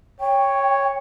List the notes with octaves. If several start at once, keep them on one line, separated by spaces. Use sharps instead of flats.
C#5 G5